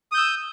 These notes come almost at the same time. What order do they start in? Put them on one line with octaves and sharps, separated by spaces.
D#6 G6 E6